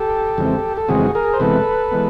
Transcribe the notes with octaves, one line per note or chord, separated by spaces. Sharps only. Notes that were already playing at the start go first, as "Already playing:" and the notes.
Already playing: G4 A4
F2 C#3 E3 G#3 C4
A4
F2 C#3 E3 G#3 C4 F#4 G#4
G#4 A#4
C5
C3 E3 G#3 B3 A4 B4
E3 G#3 B3